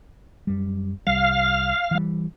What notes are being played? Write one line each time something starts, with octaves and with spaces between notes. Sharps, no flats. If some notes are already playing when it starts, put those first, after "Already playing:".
F#2 G3
C2 G3 F5
E3 G3